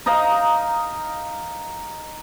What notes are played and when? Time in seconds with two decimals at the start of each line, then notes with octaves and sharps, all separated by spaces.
0.06 D#4 D#5 F5 A#5